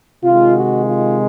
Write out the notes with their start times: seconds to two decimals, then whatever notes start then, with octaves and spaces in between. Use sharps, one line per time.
0.22 C3 D#3 G#3 F4
0.54 F#4
0.84 F4